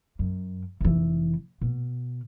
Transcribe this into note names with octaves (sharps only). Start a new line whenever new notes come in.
F#2
F1 E3
B2